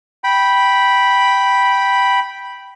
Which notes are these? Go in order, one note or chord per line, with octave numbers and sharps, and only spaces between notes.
G5 B5